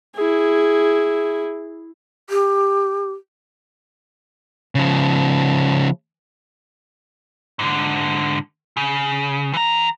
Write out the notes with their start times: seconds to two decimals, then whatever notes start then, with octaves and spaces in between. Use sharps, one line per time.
0.15 E4 G#4
2.30 G4
4.75 C#3 F3
7.59 G#2 D3
8.77 C#3
9.54 E3 A#5